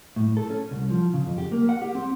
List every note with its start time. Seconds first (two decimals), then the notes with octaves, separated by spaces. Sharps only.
0.16 A2
0.37 A4
0.50 C#4
0.71 C2
0.90 F3
1.14 C#3
1.26 F2
1.38 G4
1.52 A#3
1.69 F#5
1.82 G4
1.95 C4